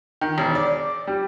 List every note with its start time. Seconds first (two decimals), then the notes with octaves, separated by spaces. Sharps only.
0.21 D#3
0.38 E1
0.55 D5
1.07 G3